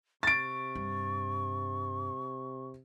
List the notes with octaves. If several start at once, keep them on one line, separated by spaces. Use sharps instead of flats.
C3 C#6 A6 D7
G2